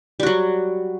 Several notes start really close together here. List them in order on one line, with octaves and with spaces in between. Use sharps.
G3 F#4 F#3